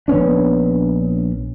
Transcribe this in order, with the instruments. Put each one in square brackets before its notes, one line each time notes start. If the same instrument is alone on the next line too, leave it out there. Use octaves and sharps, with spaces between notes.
[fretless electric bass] A#1 B3 C#4 D4